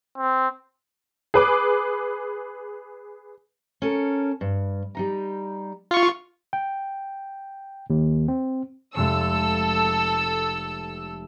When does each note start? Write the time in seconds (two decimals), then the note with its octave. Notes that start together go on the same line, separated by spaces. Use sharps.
0.17 C4
1.34 G#4 B4 D6
3.82 C#4 A4 A#4
4.41 G2
4.95 G3 D#4 A#5
5.91 F4 C#6
6.53 G5
7.90 D#2
8.28 C4
8.95 F1 G#3 A4 C#6 E6